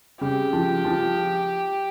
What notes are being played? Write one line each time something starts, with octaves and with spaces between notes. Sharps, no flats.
C#3 G4
F3
F3